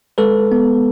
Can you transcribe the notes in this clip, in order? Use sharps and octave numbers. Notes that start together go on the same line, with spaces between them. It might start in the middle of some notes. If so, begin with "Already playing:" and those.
G#3 A4 B4
B3